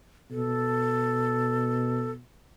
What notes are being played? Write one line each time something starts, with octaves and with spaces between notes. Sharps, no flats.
B2 A4